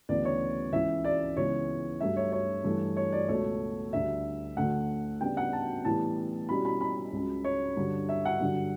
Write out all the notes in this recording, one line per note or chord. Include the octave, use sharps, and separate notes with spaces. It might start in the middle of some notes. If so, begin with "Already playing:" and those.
D2 C#3 E3 B3 D5
C#5
C#2 C#3 E3 E5
D5
C#2 C#3 E3 B3 E4 C#5
G2 F#3 A3 E5
C#5
C#5
G2 E3 A3
C#5
D5
C#2 B2 A3 C#5
D2 D3 G3 E5
D2 D3 A3 F#5
C#3 G3 B3 D4 G5
F#5
A5
A2 E3 G3 B3 A5
B2 G3 C#4 E4 B5
B5
B5
C#2 C#3 F#3
C#5
G2 D3 F#3
E5
F#5
G2 D3 F#3